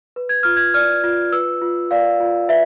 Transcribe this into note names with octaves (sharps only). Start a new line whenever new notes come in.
B4
G#6
F4 F6
G#6
D5 F6
F4
B4 E6
F4
D5 F5
F4
B4 E5